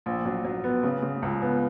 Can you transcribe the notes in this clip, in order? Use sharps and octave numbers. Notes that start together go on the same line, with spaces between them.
A#1
F#3
F#3
B3
C#3
C#3
C#2
B3